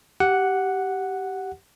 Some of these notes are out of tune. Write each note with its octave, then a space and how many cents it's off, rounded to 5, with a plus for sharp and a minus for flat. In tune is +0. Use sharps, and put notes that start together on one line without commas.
G4 -15 F#5 +0